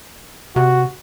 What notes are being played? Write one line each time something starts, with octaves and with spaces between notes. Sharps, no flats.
C3 F#4